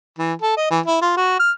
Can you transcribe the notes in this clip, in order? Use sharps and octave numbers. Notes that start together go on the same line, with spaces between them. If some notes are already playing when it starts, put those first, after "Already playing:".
E3
A4
D#5
E3
E4
F4
F#4
F6